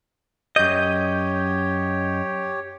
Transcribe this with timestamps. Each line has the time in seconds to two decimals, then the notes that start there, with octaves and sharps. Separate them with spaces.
0.56 F#2 G4 C#5 D#5 G6